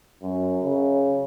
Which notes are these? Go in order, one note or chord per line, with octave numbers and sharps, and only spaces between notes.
F#2
C#3